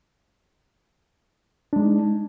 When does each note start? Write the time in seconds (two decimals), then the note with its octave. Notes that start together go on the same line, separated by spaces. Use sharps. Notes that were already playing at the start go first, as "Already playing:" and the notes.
1.73 D4
1.76 G#3
1.80 D#4